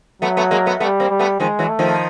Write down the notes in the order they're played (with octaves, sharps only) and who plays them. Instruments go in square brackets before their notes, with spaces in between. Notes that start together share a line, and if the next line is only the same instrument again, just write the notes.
[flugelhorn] F#3 [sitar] A3 B3
[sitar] A3 B3
G#3 A#3
A3 B3
[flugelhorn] G3 [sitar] A3 B3
[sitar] A#3 C4
[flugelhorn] G3
[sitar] A3 B3
[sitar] D#3 F3 [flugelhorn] G#3
[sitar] E3 F#3
[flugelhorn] A3
[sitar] D#3 F3